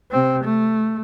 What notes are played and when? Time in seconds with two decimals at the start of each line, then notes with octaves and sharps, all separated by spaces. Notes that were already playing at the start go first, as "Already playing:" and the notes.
0.11 C3 C4
0.44 A3